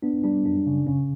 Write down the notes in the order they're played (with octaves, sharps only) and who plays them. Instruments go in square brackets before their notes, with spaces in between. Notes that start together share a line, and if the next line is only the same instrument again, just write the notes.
[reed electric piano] B3 [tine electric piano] D4
[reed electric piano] G3 [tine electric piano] D4
[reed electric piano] F#2 [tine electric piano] D4
[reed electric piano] C#3
[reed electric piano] C#3 [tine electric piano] C#4